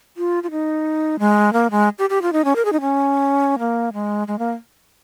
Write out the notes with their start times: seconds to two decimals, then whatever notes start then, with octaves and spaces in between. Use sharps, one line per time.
0.17 F4
0.43 F4
0.51 D#4
1.19 G#3
1.53 A#3
1.71 G#3
1.99 G4
2.10 G4
2.22 F4
2.33 D#4
2.45 C#4
2.56 A#4
2.65 G#4
2.73 D#4
2.81 C#4
3.59 A#3
3.93 G#3
4.28 G#3
4.39 A#3